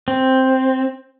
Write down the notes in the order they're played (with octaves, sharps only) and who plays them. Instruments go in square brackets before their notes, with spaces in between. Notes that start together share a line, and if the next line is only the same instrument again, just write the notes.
[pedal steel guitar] C4